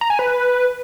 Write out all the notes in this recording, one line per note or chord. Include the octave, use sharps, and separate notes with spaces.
A#5
G#5
B4